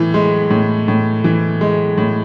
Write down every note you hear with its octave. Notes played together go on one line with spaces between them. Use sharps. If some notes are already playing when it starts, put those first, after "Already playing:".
Already playing: A2 E3
G#3
A2
A2
E3
G#3
A2